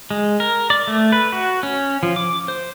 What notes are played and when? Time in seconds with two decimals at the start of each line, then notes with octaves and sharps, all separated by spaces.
0.11 G#3
0.40 A#4
0.70 D5
0.87 A3
1.12 B4
1.32 F#4
1.63 C#4
2.03 F3
2.16 D6
2.48 C5